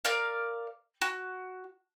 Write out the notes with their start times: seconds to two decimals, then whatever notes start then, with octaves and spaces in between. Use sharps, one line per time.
0.05 A#4 D5 F5
1.01 F#4